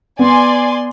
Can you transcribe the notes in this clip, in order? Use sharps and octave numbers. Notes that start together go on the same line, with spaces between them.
B3 D5 G#5 C6